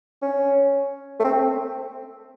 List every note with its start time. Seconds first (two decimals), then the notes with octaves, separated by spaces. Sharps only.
0.22 C#4
1.20 A3
1.24 C4